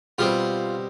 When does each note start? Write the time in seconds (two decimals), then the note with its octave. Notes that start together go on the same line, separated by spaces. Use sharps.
0.18 B2 G3 C4 F4